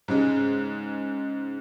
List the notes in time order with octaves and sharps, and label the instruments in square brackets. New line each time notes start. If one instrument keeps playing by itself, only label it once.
[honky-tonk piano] G#2 C#3 G#3